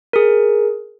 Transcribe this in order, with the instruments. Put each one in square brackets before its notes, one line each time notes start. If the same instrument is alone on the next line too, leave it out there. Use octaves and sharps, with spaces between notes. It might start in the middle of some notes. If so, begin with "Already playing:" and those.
[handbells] G#4 A#4